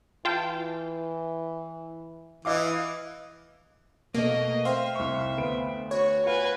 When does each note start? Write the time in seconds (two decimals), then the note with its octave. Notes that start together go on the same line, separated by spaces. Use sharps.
0.25 E3 F4 G5 A5
2.45 E3 D#5 F5 D6
4.14 B2 A3 A#3 D#5
4.65 C4 E5 F5
4.95 C2 C#6
5.37 D2 B3 B5 D7
5.91 F#4 C#5
6.26 F4 B4 F5 F#5 G#5